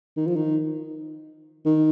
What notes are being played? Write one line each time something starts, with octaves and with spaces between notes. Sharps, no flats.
D#3
F3
D#3
D#3